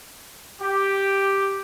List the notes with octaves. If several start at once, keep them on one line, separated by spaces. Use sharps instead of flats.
G4